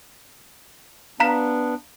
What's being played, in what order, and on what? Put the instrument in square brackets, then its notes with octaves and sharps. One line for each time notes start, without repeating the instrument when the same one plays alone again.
[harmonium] B3 D4 [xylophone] F5 A#5 B6